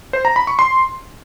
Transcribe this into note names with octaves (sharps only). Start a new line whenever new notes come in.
C5
A#5
B5
C#6
C6